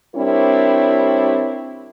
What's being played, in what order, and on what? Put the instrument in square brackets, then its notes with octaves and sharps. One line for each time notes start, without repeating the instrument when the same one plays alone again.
[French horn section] G3 C4 D4 E4 A#4 C#5